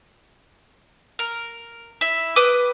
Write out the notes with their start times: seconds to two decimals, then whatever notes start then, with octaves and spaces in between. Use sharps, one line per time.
1.19 A#4
2.01 E4
2.36 B4 G5 D6 D#6